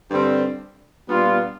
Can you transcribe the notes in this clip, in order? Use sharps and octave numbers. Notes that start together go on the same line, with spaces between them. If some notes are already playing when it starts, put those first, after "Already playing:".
G2 D3 G3 C4
A#2 G3 B3 D4 F4